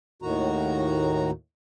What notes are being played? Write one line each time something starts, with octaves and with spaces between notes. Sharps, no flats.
D#2 A2 D#3 F#4 A#5